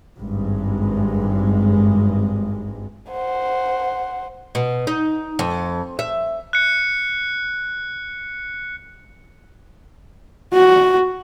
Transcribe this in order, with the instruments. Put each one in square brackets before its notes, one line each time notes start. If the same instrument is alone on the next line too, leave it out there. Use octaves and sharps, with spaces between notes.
[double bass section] G#1 G2 G#3
[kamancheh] C5 F#5
[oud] B2
D#4
F2
E5
[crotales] F#6 C#7
[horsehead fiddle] F#4